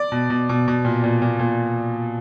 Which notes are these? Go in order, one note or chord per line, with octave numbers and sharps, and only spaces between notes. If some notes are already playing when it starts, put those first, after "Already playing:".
Already playing: D5
B2
B2
B2
B2
A#2
A#2
A#2
A#2